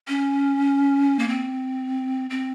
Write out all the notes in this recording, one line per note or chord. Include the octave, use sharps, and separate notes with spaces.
C#4
A#3
C4
C4